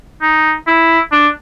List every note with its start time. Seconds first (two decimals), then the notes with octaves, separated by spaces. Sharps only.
0.22 D#4
0.67 E4
1.12 D4